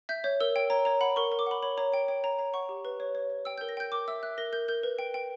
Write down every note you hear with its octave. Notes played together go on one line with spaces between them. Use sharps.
E5 G6
C#5 G6
A#4 E6
C#5 G5
C#5 A#5
C#5 A#5
F#5 B5
A#4 C#6
A#4
D6
F#5 B5
C#5 B5
C#5 A#5
C#5 G5
C#5 G5
C#5 A#5
C#5 A#5
F#5 C#6
G4
B4
C#5
C#5
C#5
G5 E6
G6
A#4
A#6
G5 G6
A#4 D6
E5 E6
E5 F#6
A#4 A#6
A#4 G6
A#4 G6
B4
G5
G5